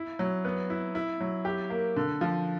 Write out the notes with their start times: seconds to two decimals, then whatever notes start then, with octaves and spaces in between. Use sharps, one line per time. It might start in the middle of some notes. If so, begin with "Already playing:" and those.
Already playing: E4
0.19 F#3
0.45 B3
0.70 E4
0.95 E4
1.21 F#3
1.45 G4
1.70 A#3
1.96 D3
2.21 F3